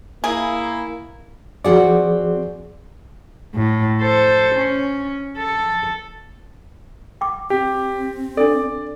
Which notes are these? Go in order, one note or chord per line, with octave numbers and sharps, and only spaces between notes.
A#3 E4 G#4
F3 C4 F#4 G#4 D5 F#5
A2
A4 C5
C#4
A4
G5 D6
C4 G4
D4 A4 D5